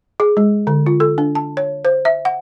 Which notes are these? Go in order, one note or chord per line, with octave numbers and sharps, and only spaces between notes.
G#4
G#3
D3
F4
A4
D4
A5
C#5
C5
E5
F#5